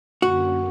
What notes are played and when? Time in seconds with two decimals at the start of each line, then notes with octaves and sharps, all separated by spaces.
0.22 F#2 D3 A#3 C#4 F#4